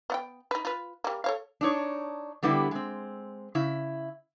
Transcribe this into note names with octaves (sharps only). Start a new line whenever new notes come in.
B3 F#5 G5
D#4 B4
F4 B4
G3 A#3
A4 C#5 F5
D4 D#4 C#5
D3 G3 B3 E4 G4
G#3 C4
C#3 E4